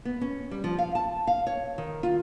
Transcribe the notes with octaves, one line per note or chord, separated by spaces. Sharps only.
B3
C#4
G3
F3
F5
A5
F5
C#5
D#3
F4